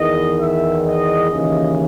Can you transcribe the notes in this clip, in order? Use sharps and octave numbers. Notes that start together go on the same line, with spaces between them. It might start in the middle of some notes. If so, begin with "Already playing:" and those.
Already playing: E2 D#3 D#5
E5
D#5
D#2 C#3 E3 D#5